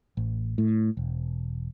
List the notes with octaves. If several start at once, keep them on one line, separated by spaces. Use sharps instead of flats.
A1
A2
E1